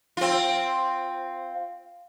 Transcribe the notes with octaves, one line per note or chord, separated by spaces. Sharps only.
C4 F4